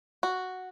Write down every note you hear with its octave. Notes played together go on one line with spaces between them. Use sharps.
F#4